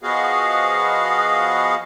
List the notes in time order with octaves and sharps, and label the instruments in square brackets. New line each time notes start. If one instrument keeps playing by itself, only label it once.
[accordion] F3 B3 F#4 G#4 D#5 F5